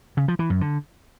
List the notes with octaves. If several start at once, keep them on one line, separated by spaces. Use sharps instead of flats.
C#3
F3
E3
F#2
D3